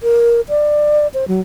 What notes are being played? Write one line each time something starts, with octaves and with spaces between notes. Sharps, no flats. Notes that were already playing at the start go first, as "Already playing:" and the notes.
A#4
D5
C5
F#3